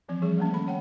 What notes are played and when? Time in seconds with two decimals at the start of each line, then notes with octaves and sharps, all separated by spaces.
0.08 E3 F3 C4
0.22 E3 G3 G#4 C#6
0.37 G3 A3 A#3 C#4
0.52 D#3 A4 B5
0.67 C#5 F#5 G5